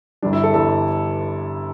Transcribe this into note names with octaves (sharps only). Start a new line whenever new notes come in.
G1 G2 E3 G3 D4
E4
A4
G1 G2 E3 G3 A4